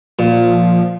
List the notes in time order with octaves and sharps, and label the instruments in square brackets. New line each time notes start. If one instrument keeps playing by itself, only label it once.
[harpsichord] A#2 [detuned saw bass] F3